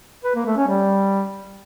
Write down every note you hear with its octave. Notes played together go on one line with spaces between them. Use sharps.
B4
A#3
A3
C#4
G3